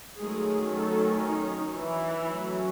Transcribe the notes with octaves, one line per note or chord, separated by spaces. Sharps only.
D#3 F#3 G#3 A3 C#4 G#4
A3 A4
D#4
E3 E4
F#3 A3 C#4